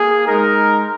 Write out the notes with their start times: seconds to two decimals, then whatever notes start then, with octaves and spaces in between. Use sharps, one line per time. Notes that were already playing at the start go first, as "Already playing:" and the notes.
Already playing: A#3 G#4
0.26 G#3 D#4 A#4